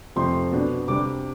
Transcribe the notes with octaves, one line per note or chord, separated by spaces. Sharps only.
F2 C3 F3 A3 C4 C6
B2 B3 D4
C3 G3 D4 D6